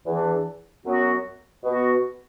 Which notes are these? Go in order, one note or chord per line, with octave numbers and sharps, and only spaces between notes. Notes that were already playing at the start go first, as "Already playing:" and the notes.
E2 E3 D4
F#2 F#3 B3 F#4
B2 B3 F#4